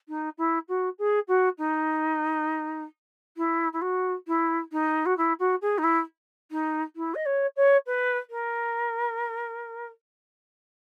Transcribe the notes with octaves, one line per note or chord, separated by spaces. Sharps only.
D#4
E4
F#4
G#4
F#4
D#4
E4
E4
F#4
E4
D#4
F#4
E4
F#4
G#4
D#4
E4
D#4
E4
D#5
C#5
C#5
B4
A#4